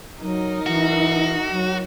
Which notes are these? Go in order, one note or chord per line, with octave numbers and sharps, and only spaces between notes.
F#3 D#4 A#4
E3 F#4
F#3